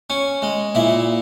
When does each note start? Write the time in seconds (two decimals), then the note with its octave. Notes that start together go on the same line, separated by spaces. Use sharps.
0.10 C#4
0.42 G#3
0.75 A#2 E4